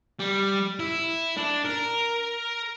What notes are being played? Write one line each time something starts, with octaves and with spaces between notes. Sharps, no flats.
G3
E4
D4
A#4